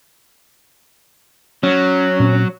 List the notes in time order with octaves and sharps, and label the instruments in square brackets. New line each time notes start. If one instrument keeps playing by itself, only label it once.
[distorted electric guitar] F#3 [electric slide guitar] C#4
[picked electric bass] A#2 C4